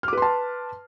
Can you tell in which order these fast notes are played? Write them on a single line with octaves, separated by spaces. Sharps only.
F6 D6 B4 C6 A5